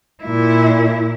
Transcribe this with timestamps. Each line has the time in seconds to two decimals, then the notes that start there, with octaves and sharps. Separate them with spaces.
0.24 A#2 E4